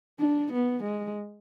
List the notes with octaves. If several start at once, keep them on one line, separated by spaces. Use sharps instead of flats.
D4
B3
G#3